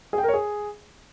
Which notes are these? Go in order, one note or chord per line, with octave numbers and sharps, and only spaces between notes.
G#4
G5
A#4
C#5
G#4